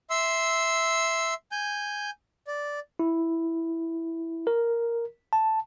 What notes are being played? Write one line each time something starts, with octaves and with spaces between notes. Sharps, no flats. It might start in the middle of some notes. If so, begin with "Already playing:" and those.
E5 C6 E6
G#5 G6
D5
E4
A#4
A5